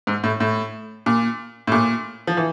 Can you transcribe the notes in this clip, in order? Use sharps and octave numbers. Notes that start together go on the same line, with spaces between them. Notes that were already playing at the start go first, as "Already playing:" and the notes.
G#2
A2
A2
A#2
A2
A#2
F3
E3